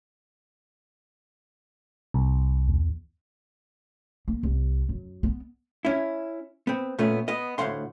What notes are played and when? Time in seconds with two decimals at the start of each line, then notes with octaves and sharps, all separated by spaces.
2.14 C2
2.68 E2
4.28 A#3
4.43 C2
4.89 F#2
5.23 B3
5.85 C#4 E4
6.67 B3 C4
6.98 A#2 A3 B3 C#4
7.28 B3 D#5
7.58 D2 A2 G#3 F5 F#5 C6